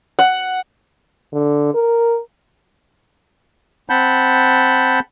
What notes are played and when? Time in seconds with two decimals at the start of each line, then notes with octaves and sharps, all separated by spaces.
0.19 F#5
1.33 D3
1.75 A#4
3.90 C4 F#5 A5 B5 G6